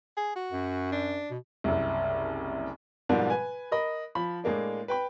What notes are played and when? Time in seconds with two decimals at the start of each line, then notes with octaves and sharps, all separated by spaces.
0.17 G#4
0.35 F#4
0.52 F#2
0.92 D4
1.30 B2
1.64 F#1 C2
3.09 G#2 B2 F3 G3 A#3
3.30 B4 G#5
3.72 A#4 D#5 B5
4.15 F3 B5
4.44 A2 G#3 A#3 D4
4.88 B4 G5 B5